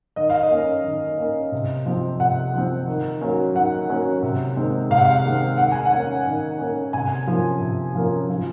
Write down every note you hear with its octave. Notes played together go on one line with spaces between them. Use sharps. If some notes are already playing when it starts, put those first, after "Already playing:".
D#3 D#5
F5
D#5
A#3 C#4
D#3
A#3 C#4
C3
F3 C4
C3 F#5
F3 C4
D#3
F#3 A#3 C#4
D#3 F#5
F#3 A#3 C#4
C3
D#3 G#3 C4
C3 F5
F#5
F5
D#3 G#3 C4
D#3 F#5
G#5
F#5
A#3 C#4
D#3
A#3 C#4
C3 G#5
F3 A#3 C#4
C3
F3 A#3 C#4
F3